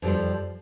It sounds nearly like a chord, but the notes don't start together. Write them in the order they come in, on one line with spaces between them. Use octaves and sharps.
F2 G3 F3